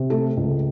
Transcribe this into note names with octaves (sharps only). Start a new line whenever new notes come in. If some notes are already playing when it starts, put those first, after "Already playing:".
Already playing: C3
A3 A4
C#2